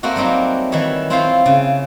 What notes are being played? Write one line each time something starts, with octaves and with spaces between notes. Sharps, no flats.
A3 A#3 C4 F#4
F#3 G3 C4 D#4 G4
D#3 E3 C#5 E5
C4 E4 F4 C5 C#5 F5
C#3